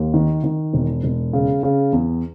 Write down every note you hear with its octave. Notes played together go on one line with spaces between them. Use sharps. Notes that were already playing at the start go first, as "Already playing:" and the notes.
Already playing: D#2
D#3
D#3
E1
E1
C#3
C#3
E2